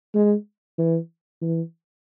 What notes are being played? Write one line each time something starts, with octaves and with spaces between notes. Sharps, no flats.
G#3
E3
E3